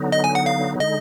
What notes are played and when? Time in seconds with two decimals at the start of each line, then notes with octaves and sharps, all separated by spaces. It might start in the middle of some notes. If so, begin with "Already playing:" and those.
Already playing: D3 F#3 B3 D#4
0.12 D#5
0.24 G#5
0.35 F#5
0.46 F5
0.80 D3 G#3 D#4 D#5